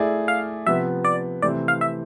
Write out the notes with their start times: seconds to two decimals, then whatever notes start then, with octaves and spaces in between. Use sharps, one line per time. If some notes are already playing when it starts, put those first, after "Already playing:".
Already playing: A3 E4 G#4 D5
0.28 F5
0.66 C3 F3 B3 E5
1.04 D5
1.42 C3 E3 A3 C4 D5
1.68 F5
1.81 E5